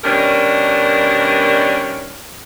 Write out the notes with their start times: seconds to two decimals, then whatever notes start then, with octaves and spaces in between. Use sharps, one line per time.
0.04 B2 D#3 G3 C#4 D4 A#4